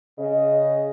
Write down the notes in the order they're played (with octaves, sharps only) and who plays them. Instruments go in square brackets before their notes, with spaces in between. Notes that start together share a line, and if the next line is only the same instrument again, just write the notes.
[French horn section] C#3 G#4 D#5